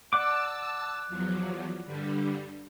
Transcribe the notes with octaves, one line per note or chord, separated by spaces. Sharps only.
D5 F#5 A5 D6 E6
E2 F3 F#3
G2 D3 G3